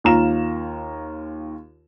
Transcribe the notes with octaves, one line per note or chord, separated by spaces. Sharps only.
D#2 F4 A#5 E7